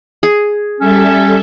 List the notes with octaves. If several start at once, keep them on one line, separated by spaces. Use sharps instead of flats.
G#4
G3 C#4 A4 E5